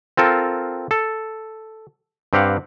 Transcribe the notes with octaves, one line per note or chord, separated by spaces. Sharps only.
C4 F4 A4 A#4
A4
G2 C4 G4 F5 F#5